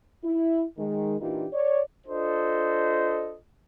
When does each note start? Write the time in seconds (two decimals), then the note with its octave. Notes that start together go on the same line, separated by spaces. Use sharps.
0.23 E4
0.77 D#3 G#3
1.21 A#2 E3 D4 D#4 F4 G4
1.53 C#5 D5
2.07 D4 F4 A4 C5 D#5